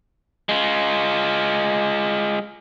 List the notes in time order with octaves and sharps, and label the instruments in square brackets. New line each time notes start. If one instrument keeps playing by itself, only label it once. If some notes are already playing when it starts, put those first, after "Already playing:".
[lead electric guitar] G#3 F4